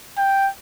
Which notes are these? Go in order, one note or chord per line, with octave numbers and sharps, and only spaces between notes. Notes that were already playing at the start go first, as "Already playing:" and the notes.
G5